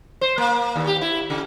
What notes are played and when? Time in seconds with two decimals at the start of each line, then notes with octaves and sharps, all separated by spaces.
0.21 C5
0.38 A#3
0.76 D#2
0.87 G4
1.01 E4
1.30 C#3